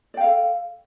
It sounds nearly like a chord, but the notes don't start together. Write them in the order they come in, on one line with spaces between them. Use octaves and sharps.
D5 G5 F5 A4